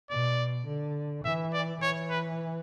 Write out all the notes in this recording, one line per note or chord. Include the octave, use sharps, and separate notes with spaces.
B2 D5
D3
E3 E5
D5
E3 C#5
B4